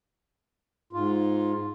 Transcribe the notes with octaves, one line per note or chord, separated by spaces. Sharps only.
G#2 F4